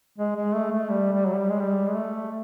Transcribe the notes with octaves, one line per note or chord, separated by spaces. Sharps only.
G#3
G#3
A3
A3
G3
G3
F#3
G3
G#3
G3
G#3
A3